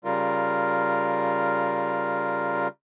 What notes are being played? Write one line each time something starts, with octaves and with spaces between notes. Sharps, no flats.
C#3 G3 F4 A#4